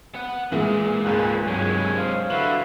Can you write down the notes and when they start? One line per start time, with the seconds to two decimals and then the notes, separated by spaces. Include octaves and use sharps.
0.15 B3 F#5
0.52 A#2 E3 G#3
1.05 G#1 C#2 G#3 B4 G5 A5 F#6
1.47 G2 C3 F#3 G#3 C#5 G#5
1.96 C5 F5
2.30 D3 E4 F#4 B4 E5 F5 F#7